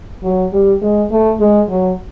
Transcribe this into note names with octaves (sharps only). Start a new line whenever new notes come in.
F#3
G3
G#3
A3
G#3
F#3